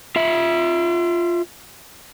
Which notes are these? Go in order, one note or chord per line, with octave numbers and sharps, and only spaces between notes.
F4 E5